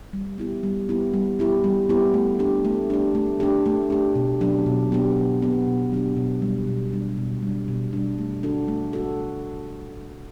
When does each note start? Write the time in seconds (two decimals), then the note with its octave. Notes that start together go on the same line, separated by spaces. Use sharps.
0.13 G3
0.38 B3 E4 G4
0.63 G3
0.89 B3 E4 G4
1.14 G3
1.39 B3 E4 G4
1.64 G3
1.89 B3 E4 G4
2.14 A3
2.39 D4 G4
2.65 A3
2.90 D4 G4
3.15 A3
3.40 D4 G4
3.66 A3
3.90 D4 G4
4.15 B2
4.41 F#3 B3 D4 G4
4.66 B2
4.91 F#3 B3 D4 G4
5.17 B2
5.41 F#3 B3 D4 G4
5.67 B2
5.92 F#3 B3 D4 G4
6.17 B2
6.42 G3 D4
6.67 B2
6.92 G3 D4
7.18 B2
7.43 G3 D4
7.68 B2
7.93 G3 D4
8.19 A3
8.43 D4 F#4 A4
8.68 A3
8.93 F#4 A4